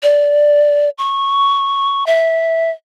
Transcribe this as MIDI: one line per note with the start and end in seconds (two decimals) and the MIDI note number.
0.03 0.90 74
0.98 2.06 85
2.07 2.70 76